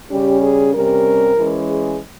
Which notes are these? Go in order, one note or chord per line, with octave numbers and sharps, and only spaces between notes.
C#3 G3 C#4 G4
G#4
C3 G3 C#4 A#4
E3 G#3 C#4
G#4